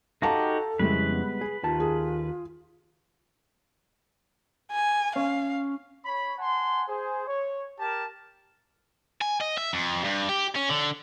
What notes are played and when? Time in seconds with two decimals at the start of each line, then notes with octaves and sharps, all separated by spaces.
0.22 D#4 F#4 G4 A4 F5 A5 A#5
0.79 F2 C#3 G3 G#3 E4 B4
1.06 B3
1.41 G#4
1.63 D#2 D#3 F4 A5
1.80 G#4
4.72 G#5
5.16 C#4 F5
6.05 C#5 B5
6.38 F#5 G#5 A5 C6
6.88 G#4 C5
7.28 C#5
7.79 G4 A#4 A5
9.21 G#5
9.41 D#5
9.57 E5
9.73 F2
10.05 G2
10.29 G4
10.55 C#4
10.69 D3